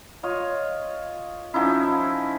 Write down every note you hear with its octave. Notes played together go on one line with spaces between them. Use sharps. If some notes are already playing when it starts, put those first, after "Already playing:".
F4 C#5 D#5
F3 C#4 D#4 E4